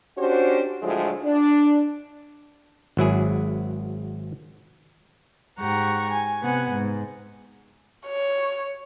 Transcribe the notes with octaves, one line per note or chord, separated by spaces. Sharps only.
C#4 D4 F#4 G4 C5
A2 D3 F3 F#3 G#3
D4
G#1 F#3 E4 G#4
G#2 G4 F#5 A#5 C#6
G#5
C3 B3 F#5 G#5
G#2
C#5